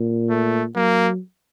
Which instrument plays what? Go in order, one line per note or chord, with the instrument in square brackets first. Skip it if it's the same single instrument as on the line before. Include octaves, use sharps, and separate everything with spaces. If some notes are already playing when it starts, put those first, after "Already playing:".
Already playing: [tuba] A#2
[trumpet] A3
[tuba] F#3 [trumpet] A#3